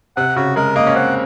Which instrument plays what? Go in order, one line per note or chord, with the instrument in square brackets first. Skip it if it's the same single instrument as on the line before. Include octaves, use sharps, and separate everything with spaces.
[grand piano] C3 [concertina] F#5
[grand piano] C#3 [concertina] F#4
[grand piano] G#3 [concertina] A#4
[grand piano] A#3 [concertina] D#5
[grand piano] C#4
[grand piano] C4 [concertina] F#5